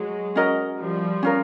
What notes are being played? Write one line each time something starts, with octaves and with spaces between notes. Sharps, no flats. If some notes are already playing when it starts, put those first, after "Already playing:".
Already playing: F#3 G#3
C#4 F#4 A#4 D#5
F3 G3
C#4 F4 A#4